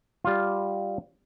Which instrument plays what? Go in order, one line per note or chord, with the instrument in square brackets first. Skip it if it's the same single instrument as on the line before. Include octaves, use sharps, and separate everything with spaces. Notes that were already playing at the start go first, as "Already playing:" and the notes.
[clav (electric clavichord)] G3 F4